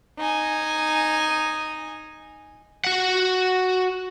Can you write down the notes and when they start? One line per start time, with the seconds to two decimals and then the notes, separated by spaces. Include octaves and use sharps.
0.19 D#4 G#5
2.84 F#4 F#5